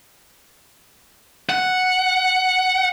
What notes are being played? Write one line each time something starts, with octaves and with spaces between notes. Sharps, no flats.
F#5